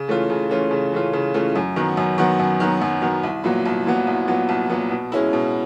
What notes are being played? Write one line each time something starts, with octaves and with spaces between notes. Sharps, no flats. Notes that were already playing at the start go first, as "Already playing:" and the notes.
Already playing: C#3
E3 A3 C#4 F4
C#3
E3 A3 C#4 F4
C#3
E3 A3 C#4 F4
C#3
E3 A3 C#4 F4
F#2
D#3 F#3 B3
F#2
D#3 F#3 B3
F#2
D#3 F#3 B3
F#2
D#3 F#3 B3
C2
A#2 F#3 B3
C2
A#2 F#3 B3
C2
A#2 F#3 B3
C2
A#2 F#3 B3
B2
G#3 C#4 E4
B2